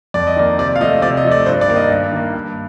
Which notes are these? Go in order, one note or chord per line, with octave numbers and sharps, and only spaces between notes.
F2 D5
D#5
D#3 A#3 D5
C3 D5
F5
F3 A3 D#5
C3 D5
D#5
F3 A3
D5
G2 C5
D5
D#3 A#3
D#5
G2
D#3 A#3
G2